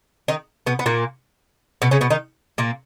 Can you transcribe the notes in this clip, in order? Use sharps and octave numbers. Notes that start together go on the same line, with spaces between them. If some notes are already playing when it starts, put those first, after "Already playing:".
D#3 D#4
B2 B3
B3
A#2 A#3
B2 B3
C#3 C#4
B2 B3
D#3 D#4
A#2 A#3